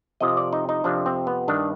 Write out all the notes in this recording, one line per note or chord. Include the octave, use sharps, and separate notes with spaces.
F2 C3 F3 D#5
D5
D#4
D#4
F2 C3 F3 D4
C4
B3
G2 D#3 D4